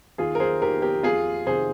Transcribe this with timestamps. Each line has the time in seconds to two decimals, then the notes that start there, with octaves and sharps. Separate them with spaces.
0.18 D#2 F4 G#4
0.35 A#4
0.40 G#4 C5
0.62 D#3 G4 A#4
0.82 G4 A#4
1.03 F2 F4 G#4
1.47 C3 D#3 G#4 C5